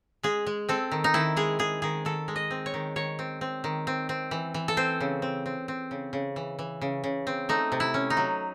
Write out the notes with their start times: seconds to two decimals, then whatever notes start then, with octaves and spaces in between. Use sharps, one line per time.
0.23 G#3 G#4
0.47 G#3
0.69 C4 A4
0.91 D#3
1.04 D#4
1.14 D#3 E4
1.36 G#3 G#4
1.59 G#3 G#4
1.82 D#3 G#4
2.05 D#3 A4
2.28 G#3
2.36 D#5
2.50 C4
2.66 C#5
2.74 D#3
2.96 D#3 C#5
3.19 C4
3.41 C4
3.64 D#3
3.87 C4
4.09 C4
4.31 E3
4.54 E3
4.68 A4
4.77 C4 C5
5.01 C#3
5.22 C4
5.46 C4
5.68 C4
5.91 C#3
6.13 C#3
6.36 E3
6.59 E3
6.81 C#3
7.04 C#3
7.27 C4
7.49 A3 D#4
7.72 C3
7.80 E4
7.94 C#4
8.10 D#4
8.17 F#3